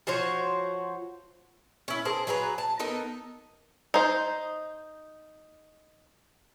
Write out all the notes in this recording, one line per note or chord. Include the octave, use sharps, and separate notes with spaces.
F3 F#4 C5 C#5
C#4 E4
G#4 A#4 C5 A5
F#3 G#4 B4 A#5
A5
B3 D#4 A4 A#4
D#4 C5